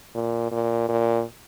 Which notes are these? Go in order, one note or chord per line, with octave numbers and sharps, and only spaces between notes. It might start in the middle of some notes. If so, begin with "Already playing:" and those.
A#2
A#2
A#2